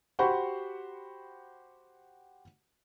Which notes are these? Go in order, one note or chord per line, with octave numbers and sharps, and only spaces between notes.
F#4 G4 C5 F#5 B5 C#6